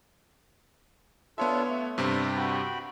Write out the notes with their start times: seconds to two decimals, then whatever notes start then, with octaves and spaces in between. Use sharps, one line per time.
1.38 B3 D4 F4 A4 C#5 E5
1.69 A3
1.98 G2 C3 C4
2.37 F#4 G5 B5